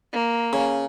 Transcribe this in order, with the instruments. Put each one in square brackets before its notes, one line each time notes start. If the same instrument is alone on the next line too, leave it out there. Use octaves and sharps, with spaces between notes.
[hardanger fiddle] A#3
[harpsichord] C#3